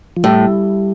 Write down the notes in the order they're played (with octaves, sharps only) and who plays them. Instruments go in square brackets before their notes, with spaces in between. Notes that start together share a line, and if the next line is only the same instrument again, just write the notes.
[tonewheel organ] F3
[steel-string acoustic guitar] A2 [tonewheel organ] G3